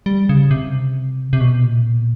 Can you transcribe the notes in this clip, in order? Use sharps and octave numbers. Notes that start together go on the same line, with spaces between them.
G3
C#3
C3
C3
B2
A#2